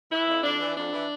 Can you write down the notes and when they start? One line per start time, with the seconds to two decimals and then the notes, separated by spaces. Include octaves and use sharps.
0.11 E3 E4
0.28 F2
0.44 F2 D4
0.60 E3
0.76 F2 D4
0.92 E3